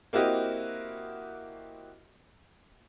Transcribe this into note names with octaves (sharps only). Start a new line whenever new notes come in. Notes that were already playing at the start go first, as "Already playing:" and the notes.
A#3 C4 E4 F#4 G4 D#5